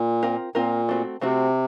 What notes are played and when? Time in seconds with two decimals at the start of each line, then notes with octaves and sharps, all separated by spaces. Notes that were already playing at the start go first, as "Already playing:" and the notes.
Already playing: A#2
0.23 C4 F4 A#4
0.55 A#2 C4 F4 A#4
0.89 A3 C4 F#4
1.21 C3 A3 C4 F#4